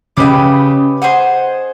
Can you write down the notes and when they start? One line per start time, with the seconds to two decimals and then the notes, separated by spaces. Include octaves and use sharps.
0.17 C#3 G4 B4 D#5 G5
1.02 G#4 C5 D#5 F#5